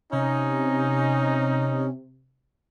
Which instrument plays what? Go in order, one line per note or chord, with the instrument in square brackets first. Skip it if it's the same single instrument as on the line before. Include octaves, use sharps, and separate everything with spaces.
[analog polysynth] C3 [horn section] C#4 D#4